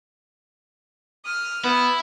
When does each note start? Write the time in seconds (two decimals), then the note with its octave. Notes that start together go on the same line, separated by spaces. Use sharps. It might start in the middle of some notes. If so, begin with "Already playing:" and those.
1.24 D#6 F6
1.64 B3 E4